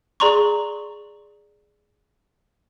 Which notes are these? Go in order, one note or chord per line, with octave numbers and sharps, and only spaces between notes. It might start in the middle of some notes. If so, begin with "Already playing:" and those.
G#4 D5 A#5 C6 C#6